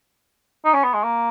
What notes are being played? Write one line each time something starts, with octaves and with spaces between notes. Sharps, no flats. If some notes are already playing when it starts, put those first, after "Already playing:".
D#4
C#4
B3
G#3
A#3